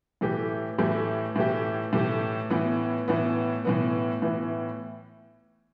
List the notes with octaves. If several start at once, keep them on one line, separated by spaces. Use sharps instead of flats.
A2 E3 A3 G4
A2 E3 A3 G4
A2 E3 A3 G4
A2 E3 A3 G4
A2 E3 B3
A2 E3 B3
A2 E3 B3
A2 E3 B3